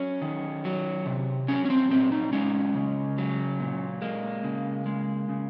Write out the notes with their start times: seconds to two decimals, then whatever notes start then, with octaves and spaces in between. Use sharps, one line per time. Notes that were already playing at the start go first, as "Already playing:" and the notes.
Already playing: F#3 C#4
0.22 D#3
0.65 F#3
1.06 C3
1.48 F#3 C#4
1.65 C#4
1.70 C4
1.91 A#2 C4
2.12 D#4
2.33 G#3 C#4
2.75 C#3
3.18 F#3
3.60 A#2
4.02 G#3 A#3
4.44 C#3
4.86 G#3
5.29 C#3